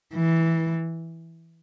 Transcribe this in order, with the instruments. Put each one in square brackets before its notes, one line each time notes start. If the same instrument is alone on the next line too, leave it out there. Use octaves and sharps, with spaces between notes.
[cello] E3